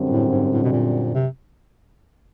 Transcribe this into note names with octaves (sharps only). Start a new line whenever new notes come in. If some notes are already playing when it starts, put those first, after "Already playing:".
Already playing: F#2 D3 G3 C4
A2
G#2
A2
B2
A#2
C3